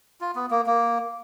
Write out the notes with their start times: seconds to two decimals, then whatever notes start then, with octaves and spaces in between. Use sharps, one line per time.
0.21 F4
0.36 B3
0.51 A#3
0.66 A#3